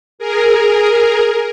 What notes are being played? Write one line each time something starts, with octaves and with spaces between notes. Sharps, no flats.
G#4 A#4